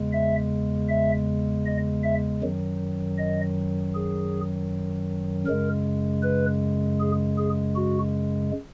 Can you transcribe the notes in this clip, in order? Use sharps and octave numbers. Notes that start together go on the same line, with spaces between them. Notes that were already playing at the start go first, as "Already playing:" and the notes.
Already playing: E2 C#3 G#3
E5
E5
D#5
E5
F#2 D#3 F#3
D#5
G#4
F#2 C#3 G#3 A#4
B4
G#4
G#4
F#4